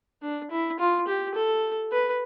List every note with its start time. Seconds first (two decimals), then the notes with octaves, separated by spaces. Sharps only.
0.22 D4
0.51 E4
0.79 F4
1.08 G4
1.35 A4
1.92 B4